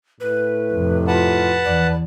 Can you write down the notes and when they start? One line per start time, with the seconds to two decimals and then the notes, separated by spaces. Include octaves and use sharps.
0.20 A2 B4
0.73 F2 C3
1.08 F4 B4 F#5 A5
1.65 E2 D5